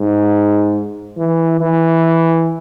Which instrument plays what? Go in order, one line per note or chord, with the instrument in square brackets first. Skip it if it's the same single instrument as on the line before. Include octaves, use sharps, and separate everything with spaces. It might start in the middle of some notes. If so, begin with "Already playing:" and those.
Already playing: [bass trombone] G#2
E3
E3